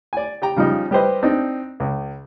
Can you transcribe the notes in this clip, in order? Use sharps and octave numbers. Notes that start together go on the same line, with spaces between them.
D5 G#5
G4 G5 A#5
C#3 F3 G3 D#4
G3 G4 B4 C5 D#5
C4 D4 D#4
C#2